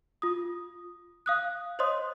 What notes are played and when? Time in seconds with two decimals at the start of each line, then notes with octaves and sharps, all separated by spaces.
0.22 F4 D#6
1.26 F5 D#6 F#6
1.79 C5 C#5 D#5 C6 D#6